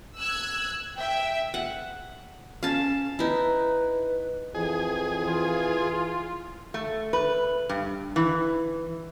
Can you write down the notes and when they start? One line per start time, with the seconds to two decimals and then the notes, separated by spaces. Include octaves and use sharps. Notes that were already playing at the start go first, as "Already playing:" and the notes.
0.18 E6 F#6 G#6
0.97 E5 G5
1.54 F#5
2.63 C#4 F5 A5
3.19 D#4 E4 B4
4.55 F2 E3 G#4
5.24 E3 F4
6.74 A3
7.13 B4
7.69 G2
8.16 E3